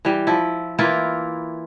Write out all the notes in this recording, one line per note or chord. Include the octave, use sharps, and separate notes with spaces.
E3 G3
F3 E4
E3 A#3 E4 F4